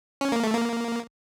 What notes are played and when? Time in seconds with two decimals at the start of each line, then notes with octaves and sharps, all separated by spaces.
0.21 C#4
0.32 A#3
0.43 A3
0.54 A#3